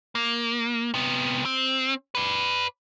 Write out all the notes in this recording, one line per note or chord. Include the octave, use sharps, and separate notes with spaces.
A#3
C3 B3
C4
B4 D5